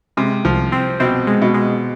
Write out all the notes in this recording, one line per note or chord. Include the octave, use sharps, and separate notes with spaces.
C3 G#3
C2 F3
C4
B2 C4
G#3
B2
G#3